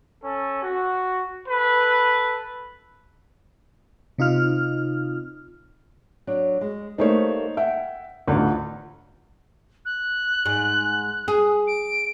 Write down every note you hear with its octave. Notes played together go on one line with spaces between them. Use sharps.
C#4 A4
F#4
A4 B4
C3 D#4 F4 F6
F#3 D4
G#3
G3 A3 A#3 D#4 C5 C#5
E5 F#5 G5
A1 D2 B3 D#4 F4
F#6
G#2
G#4
D7